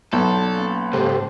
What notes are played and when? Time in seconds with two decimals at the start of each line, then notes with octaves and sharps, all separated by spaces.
0.13 B1 A4 D5
0.56 A#3 C#4
0.93 C#2 G#2 G4 A4 C5